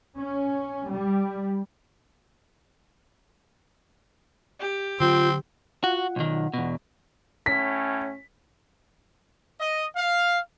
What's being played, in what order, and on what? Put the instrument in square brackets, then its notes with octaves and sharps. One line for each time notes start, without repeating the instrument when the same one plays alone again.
[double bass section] C#4
G3
[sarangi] G4
[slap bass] D3 F#3 [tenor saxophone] C4 [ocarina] F4
[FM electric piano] F4 F#5 [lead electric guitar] F#4
[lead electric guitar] B1 D#3
E2 B2
[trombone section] A2 C#4 [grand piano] B6
[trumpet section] D#5
F5